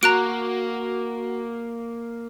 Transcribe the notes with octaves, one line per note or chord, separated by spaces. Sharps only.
A#3 F#4 A#5 F#6 D7